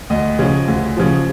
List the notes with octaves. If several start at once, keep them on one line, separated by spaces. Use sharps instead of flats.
D2 D#5
C#3 F3
D2
C#3 F3